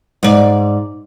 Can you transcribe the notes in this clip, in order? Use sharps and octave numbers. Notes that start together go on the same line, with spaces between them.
G#2 D5